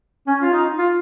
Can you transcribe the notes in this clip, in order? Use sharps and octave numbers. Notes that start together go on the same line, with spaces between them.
C#4
F4
D#4
F4